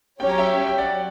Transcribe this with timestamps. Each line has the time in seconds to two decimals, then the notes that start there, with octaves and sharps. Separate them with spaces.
0.20 F#3 C#4 G4 C#5 G5
0.29 A#5
0.38 E5 G5
0.67 G5
0.78 D5 F#5